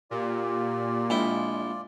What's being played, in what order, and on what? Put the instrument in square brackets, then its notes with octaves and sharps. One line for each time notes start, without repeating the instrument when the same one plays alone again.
[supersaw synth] A#2 [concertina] F4 D5 [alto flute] G4
[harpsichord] A#1 E4 G5 [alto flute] G#3